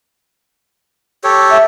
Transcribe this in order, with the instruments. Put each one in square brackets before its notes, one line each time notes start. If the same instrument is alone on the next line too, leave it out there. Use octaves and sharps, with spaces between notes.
[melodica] G4 A4 C#5
[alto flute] E5